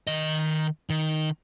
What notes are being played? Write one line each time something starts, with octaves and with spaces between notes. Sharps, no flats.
D#3 D#5
D#3